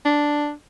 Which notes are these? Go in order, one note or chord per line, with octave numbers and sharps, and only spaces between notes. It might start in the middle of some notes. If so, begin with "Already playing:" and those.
D4